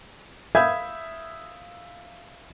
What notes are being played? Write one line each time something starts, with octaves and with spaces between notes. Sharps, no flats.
E5 F5 B5 D#6 G6 G#6